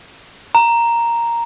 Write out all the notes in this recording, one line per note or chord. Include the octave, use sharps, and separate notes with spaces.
A#5